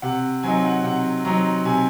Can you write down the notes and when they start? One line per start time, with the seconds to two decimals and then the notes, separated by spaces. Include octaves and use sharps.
0.02 C3 F#5
0.43 F#3 C4 D#4 G#5
0.64 F#5
0.84 C3 F#5
1.24 F#3 C4 D#4 A#5
1.65 C3 G#5